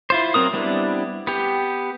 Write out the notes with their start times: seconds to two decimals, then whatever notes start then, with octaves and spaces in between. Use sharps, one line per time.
0.10 E4 F4 C5
0.34 F#3 C4 A#4 D#6
0.53 G3 B3 C4 D4 E4
1.27 B3 G4